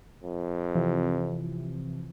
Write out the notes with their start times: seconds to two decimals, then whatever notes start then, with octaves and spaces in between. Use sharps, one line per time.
0.23 F2
0.75 C3 E3 F3